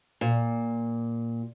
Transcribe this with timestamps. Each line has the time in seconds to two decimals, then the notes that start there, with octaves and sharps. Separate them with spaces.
0.21 A#2